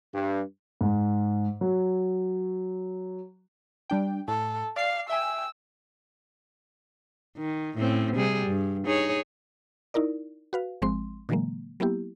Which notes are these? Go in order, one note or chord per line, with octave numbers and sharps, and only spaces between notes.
G2
G#2
F#3
G3 D4 G5
A2 A4
D5 F5 C7
E5 G5 G#5 E6
D#3
A2 C4 C#4
C3 G3 G#4
G2
D#4 G#4 C#5
D#4 E4 A#4 D5
F#4 B4 F5
G#1 F3 G#3 C4 C6
A#2 D3 E3 F#3 G#3 A#3
F#3 A#3 B3 E4 G4